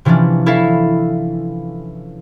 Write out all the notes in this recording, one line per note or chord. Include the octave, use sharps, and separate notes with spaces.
C3 E3 F3 C#4 D4
E4 A4 C#5 E5 F5